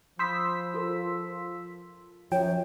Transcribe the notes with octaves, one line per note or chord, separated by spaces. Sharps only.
F3 B5 C6 D#6 E6 G6 B6
F4 A4 A#4
F#2 F3 C#5 G5